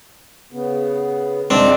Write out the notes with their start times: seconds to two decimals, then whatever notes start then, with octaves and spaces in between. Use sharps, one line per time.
0.52 C#3 B3
1.50 F2 G#3 C4 D4 E5